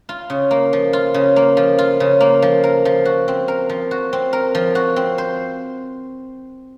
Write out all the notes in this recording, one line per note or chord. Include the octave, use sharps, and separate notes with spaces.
F4
C#3
A#3
F3
F4
C#3
A#3
F3
F4
C#3
A#3
F3
A#4
F3
F#4
C4
A#4
F3
F#4
C4
A#4
F3
F#4
C4
C5